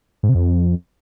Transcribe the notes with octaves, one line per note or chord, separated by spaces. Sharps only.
G#2
C3
F2